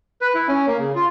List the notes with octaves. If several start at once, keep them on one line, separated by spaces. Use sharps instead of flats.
B4
E4
C#4
A#3
C#3
F4